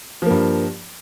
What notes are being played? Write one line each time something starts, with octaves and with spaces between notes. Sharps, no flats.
G2 F3 A#3